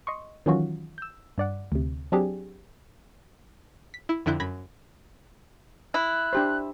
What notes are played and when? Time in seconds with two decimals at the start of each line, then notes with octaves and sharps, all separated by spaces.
0.07 D#5 C6 C#6
0.46 D#3 E3 F#3 C#4 F4 F#4
0.98 E6 G6
1.38 G2 D5 F#5
1.72 D2 C3
2.12 F#3 C4 D4 G4 G#4
3.94 B6
4.09 E4
4.26 F2 D3 E4 F#6 G6
4.40 F#2 B5 G#6 A#6
5.94 E4 F#6
6.33 D4 G4 C5